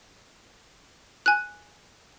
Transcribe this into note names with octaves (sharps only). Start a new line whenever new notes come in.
G#5 F#6